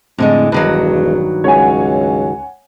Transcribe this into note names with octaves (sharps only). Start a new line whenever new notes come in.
F2 A2 D3 G#3
E1 G2 D#3 F#3
C#2 C#5 F#5 G#5